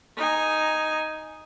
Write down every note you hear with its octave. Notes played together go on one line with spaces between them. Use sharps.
D#4 G#5